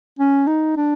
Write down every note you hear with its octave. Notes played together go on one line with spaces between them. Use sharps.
C#4
D#4
D4